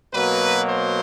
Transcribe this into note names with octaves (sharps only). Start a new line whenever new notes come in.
B2 F#3 A#3 B4
C5